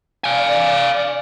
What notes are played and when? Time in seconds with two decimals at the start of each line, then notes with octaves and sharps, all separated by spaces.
0.24 D5 F5 G#5